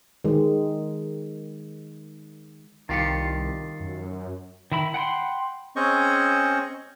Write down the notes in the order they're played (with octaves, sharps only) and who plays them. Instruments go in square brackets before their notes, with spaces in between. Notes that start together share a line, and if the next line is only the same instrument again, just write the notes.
[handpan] D#3 G#3
[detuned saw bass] C2 [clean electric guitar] D#3 F4 G4 [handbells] A6 C7 C#7
[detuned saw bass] F#2
[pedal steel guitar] D#3 E4 B5
F#5 G5 B5 C6
[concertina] C4 C#4 G#4 C5 D#5 C#6